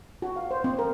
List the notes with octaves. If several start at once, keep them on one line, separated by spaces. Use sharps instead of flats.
F#4
F5
C5
C4
A#4